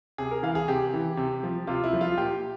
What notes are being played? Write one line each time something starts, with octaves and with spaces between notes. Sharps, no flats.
C3 G#4
A#4
E3 F5
G#4
C3 G4
E3
C3
F3
C3 F4
E4
F3
F4
A#2 G4